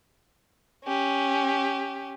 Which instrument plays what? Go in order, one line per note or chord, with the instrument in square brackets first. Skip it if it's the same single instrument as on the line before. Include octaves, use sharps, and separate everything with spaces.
[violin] C#4 G4